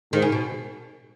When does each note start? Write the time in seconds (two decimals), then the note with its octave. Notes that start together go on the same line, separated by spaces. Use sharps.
0.13 G#2 D#3
0.22 C#3
0.32 B2